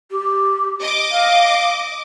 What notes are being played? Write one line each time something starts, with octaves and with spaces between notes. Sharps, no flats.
G4
D#5 D6
F5